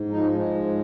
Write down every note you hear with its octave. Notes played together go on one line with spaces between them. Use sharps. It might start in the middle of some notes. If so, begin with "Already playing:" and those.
Already playing: G#2
F3 D#4
G#3
G#2